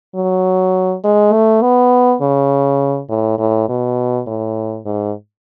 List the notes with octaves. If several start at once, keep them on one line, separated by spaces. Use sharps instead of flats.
F#3
G#3
A3
B3
C#3
A2
A2
B2
A2
G#2